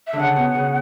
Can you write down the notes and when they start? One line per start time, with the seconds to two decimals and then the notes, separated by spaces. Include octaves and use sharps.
0.07 E5
0.13 D3
0.19 C#3 F#5
0.36 B2
0.55 C#3